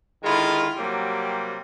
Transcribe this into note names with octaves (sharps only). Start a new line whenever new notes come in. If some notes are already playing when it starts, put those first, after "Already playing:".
D3 D#3 G#3 E4 F4
C3 F#3 G3 A#3 C4